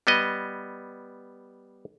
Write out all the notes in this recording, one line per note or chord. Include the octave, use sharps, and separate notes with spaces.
G3 B3 D#5